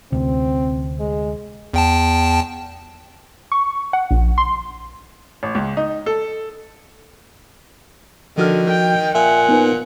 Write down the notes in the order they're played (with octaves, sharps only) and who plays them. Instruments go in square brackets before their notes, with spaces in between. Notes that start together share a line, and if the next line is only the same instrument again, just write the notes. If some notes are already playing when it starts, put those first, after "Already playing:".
[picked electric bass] D2 C3 [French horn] C4
[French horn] G#3
[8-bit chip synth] E2 G5 A5
[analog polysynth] C#6
F#5
A#1
C6
[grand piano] A1
C#2
D#4
A4
[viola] D3 [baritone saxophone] D#3 [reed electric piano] F3 F#4 F6
[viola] G5
[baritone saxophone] A#2 [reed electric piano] E5 [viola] F#5 [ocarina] G#5
[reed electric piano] B3 D#4 B4